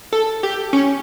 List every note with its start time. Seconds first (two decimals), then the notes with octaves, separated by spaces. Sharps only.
0.12 A4
0.43 G4
0.73 C#4